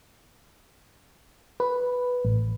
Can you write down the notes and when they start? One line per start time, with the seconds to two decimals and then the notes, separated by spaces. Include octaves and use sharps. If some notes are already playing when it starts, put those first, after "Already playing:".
1.60 B4
2.25 A1